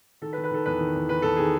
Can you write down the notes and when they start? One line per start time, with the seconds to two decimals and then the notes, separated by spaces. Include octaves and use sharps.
0.21 D#3 A4
0.33 B4
0.37 D#3
0.44 B4
0.51 D#3 A4
0.66 E2 B4
0.80 D#3
0.95 E2
1.09 D#3 B4
1.22 E2 A4
1.37 D#3 G#4